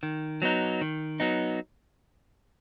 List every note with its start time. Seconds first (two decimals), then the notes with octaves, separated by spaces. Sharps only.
0.03 D#3
0.42 F#3 B3 D#4
0.81 D#3
1.20 F#3 B3 D#4